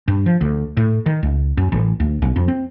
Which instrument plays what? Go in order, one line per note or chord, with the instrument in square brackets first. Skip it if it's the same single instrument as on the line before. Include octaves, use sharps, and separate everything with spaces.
[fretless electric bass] G2
F3
D2
A2
D#3
C#2
F#2
A1
D2
B1
F2
C4